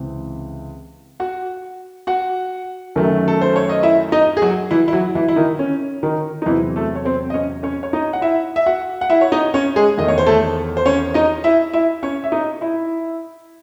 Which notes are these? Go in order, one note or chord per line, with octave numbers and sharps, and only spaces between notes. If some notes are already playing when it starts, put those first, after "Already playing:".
Already playing: C#2 C3 E3 C4
F#4 F#5
F#4 F#5
F#2 D#3 F#3 A3
A4
C5
C#5
D#5
E4 E5
D#4 D#5
G#4
F#3 F#4
E3 E4
E4
F#3 F#4
E3 E4
E4
D#3 D#4
C#4
D#3 D#4
D#4
E2 C3 E3 F#3 C4 E4
A3 A4
C#5
C4 C5
D#5
C#4 C#5
C#4 C#5
C#5
D#4 D#5
F#5
E4 E5
E5
F#4 F#5
F#5
E4 E5
C#5
D#4 D#5
C#4 C#5
G#3 G#4
E2 D#3 A3 D#5
C#5
C5
A3 A4
C5
C#4 C#5
D#4 D#5
E4 E5
E4 E5
C#4 C#5
E5
D#4 D#5
E4 E5